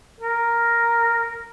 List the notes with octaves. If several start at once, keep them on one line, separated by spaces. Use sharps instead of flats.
A#4